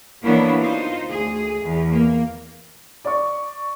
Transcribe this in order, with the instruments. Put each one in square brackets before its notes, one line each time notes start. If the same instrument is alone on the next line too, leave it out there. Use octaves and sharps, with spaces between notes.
[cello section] E3 F#3 A#3 B3 D4 E4
D#4 F4 C5
D2 G#4
E2
A#3
[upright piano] D5 C#6